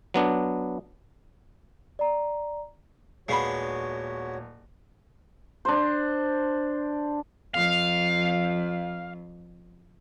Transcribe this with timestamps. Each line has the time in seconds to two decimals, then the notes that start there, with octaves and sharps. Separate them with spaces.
0.14 F#3 B3 D4
1.99 D5 A#5
3.28 D#1 G#3 B3 F#4 C#5 F5 B5
5.65 D4 C5
7.54 F2 F5